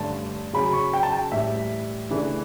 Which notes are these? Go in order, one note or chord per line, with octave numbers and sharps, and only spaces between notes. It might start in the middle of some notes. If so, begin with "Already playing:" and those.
Already playing: G2 D3 A3 C#4 A5
C#3 F#3 C#4 B5
C#6
G5
A5
G5
A2 E3 G3 E5
C#3 E3 A3 D4